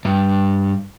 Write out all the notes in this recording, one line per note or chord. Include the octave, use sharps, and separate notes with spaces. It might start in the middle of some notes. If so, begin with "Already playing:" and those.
G2